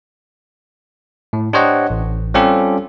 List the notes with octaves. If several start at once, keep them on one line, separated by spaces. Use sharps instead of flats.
A2
D4 G4 C5 C#5 D#5 F#5
A1
G3 C4 C#4 F4 G4 A4